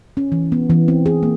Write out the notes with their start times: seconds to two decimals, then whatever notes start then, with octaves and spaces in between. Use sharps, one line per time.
0.17 C#4
0.32 E3
0.52 B3
0.70 E3
0.88 C4
1.06 G#4
1.23 A#3